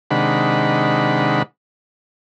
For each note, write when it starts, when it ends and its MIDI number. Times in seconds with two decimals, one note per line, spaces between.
0.11 1.43 48
0.11 1.43 51
0.11 1.43 56
0.11 1.43 62
0.11 1.43 78
0.11 1.43 83